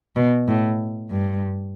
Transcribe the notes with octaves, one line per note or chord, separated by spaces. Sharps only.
B2
A2
G2